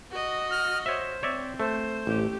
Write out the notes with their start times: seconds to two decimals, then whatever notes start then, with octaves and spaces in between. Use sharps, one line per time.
0.12 F#4 D#5
0.51 F6
0.86 C5 C#5 E5
1.23 C4 C#5 D5 E5
1.60 A3 C5
2.07 A1 A3 G4